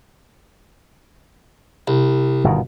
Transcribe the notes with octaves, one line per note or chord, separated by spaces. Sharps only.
C2
G1 B2 D#3